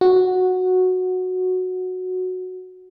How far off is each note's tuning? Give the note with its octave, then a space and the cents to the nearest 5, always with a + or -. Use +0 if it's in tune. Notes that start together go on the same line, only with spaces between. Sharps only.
F#4 -5